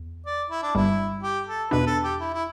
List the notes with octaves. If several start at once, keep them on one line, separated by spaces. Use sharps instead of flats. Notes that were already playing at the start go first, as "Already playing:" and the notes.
Already playing: E2
D5
E4
D4
G1 G2 G3 E4
G4
A4
E2 B2 B3 D4 B4
A4
G4
E4
E4